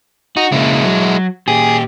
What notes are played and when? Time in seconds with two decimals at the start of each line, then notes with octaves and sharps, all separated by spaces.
0.37 D#4 F#4
0.52 C#3 G#3 A#3 E4
0.84 F#3
1.48 A#2 G4 G#4